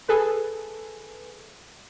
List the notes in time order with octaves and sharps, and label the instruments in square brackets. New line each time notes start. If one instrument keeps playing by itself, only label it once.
[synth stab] G#4 A4 B4